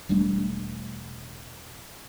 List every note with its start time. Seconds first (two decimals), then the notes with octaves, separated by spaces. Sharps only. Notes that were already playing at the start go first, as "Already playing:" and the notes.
0.09 E1 G3 A3 D4